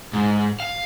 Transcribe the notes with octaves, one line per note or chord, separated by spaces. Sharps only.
G#2
F5